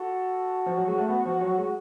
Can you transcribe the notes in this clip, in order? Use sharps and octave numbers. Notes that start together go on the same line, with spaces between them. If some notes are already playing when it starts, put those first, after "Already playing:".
Already playing: F#4 A4
F3
F#3
G#3
A3
B3
F3
F#3
G#3